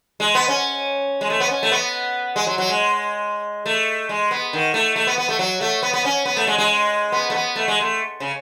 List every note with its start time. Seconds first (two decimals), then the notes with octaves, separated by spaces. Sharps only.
0.20 G#3
0.35 B3
0.48 C#4
1.21 G#3
1.30 A3
1.40 B3
1.49 C#4
1.63 A3
1.72 B3
2.36 G#3
2.47 F#3
2.58 F#3
2.69 G#3
3.66 A3
4.09 G#3
4.31 B3
4.53 D#3
4.74 A3
4.96 A3
5.07 B3
5.18 B3
5.29 A3
5.39 F#3
5.61 A3
5.83 B3
5.94 B3
6.05 C#4
6.25 B3
6.37 A3
6.47 G#3
6.58 G#3
7.12 B3
7.30 A3
7.35 B3
7.56 A3
7.68 G#3
7.81 A3
8.20 C#3